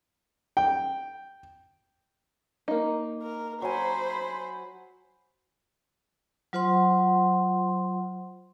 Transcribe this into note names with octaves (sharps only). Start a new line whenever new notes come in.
G5
A#3 D#4
A#4
F#3 C5 G#5 B5
F#3 F4 C5 F#5 C6